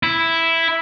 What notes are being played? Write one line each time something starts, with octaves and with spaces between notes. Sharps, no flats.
E4